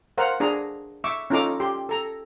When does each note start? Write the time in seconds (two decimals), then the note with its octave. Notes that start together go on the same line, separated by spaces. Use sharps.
0.18 A#4 C5 F5 F#5 A#5
0.40 D4 G#4 A#5
1.04 E5 C#6 D6 E6
1.30 C#4 D#4 F4 A4 A#5 D6
1.60 G4 C6
1.89 A4 A#5